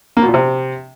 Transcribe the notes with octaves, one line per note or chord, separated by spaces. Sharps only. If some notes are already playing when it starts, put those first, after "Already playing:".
A#3
B2
A#2
C3